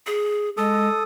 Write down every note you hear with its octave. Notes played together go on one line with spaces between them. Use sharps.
G#4
G#3 A4 D#6